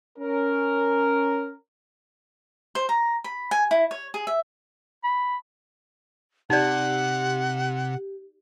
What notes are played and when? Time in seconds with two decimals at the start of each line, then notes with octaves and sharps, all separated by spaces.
0.19 C#4 A#4
2.75 C5
2.89 A#5
3.24 B5
3.51 G#5
3.71 E4
3.91 C#5
4.14 G#4
4.27 E5
5.04 B5
6.50 C3 D#4 G4 D5 F#5